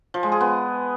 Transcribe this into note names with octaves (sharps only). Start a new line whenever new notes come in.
F3
G#3
G#4
B3